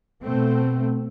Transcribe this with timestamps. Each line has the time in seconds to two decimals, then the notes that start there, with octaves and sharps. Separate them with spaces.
0.24 B2 A3 C4